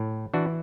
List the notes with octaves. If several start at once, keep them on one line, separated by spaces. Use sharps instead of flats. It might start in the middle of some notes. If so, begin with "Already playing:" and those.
Already playing: A2
E3 D4 F#4